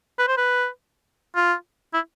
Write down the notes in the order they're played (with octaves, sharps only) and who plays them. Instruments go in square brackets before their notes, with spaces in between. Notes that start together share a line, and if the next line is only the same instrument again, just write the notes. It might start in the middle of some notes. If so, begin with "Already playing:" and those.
[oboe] B4
C5
B4
F4
E4